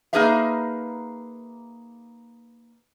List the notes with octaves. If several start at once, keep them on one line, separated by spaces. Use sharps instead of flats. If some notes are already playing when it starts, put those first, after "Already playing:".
A#3 D#4 G#4 B4 E5 F5